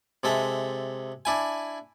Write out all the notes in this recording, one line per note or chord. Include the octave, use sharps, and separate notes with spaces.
C3 G#3 A4 E5
D4 E4 G#5